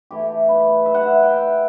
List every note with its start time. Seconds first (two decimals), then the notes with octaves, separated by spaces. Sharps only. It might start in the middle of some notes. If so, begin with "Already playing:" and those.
0.11 E3 A3 E4 G4
0.49 B4
0.86 E5
0.94 F#5
1.03 E5
1.23 G5